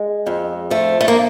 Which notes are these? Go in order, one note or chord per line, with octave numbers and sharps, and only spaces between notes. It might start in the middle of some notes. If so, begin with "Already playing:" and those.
Already playing: G#3
F2
F3 A3
A3
A#3